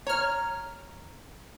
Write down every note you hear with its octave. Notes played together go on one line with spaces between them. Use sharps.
C#5 A#5 F6